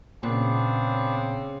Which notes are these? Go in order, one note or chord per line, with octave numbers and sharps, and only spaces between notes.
A#2 C#3 B3 C4 D4